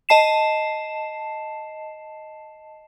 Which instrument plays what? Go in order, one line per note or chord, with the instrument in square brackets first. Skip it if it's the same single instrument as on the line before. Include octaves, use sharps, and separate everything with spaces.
[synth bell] D#5 A5 C7 E7